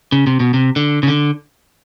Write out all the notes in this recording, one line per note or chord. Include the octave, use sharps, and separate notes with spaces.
C#3
C3
B2
C3
D3
C#3
D3